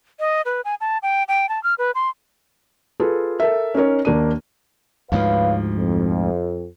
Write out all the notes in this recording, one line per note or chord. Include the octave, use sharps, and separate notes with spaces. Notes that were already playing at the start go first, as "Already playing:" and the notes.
D#5
B4
G#5
A5
G5
G5
A5
F6
B4
C6
F4 G#4 A4 B4
A4 A#4 E5
C#4 D#4 A#4 C#5
D#2 A#3 D4 D#7
D2 G#2 F3 B4 C#5 F5
F2